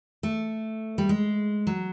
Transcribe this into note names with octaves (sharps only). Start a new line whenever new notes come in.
A3
G3
G#3
F#3